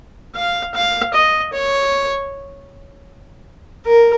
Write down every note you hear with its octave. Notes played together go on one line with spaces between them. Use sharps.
F5
F5
D#5
C#5
A#4